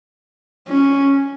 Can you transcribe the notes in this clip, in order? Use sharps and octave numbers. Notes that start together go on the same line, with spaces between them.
C#4